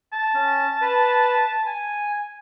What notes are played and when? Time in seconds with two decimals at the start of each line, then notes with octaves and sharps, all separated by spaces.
0.13 A5
0.34 C#4
0.82 B4
1.66 G#5